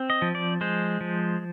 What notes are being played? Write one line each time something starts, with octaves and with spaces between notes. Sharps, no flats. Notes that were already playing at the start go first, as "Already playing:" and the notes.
Already playing: C4
D#5
F3
D5
G#3 C5
F3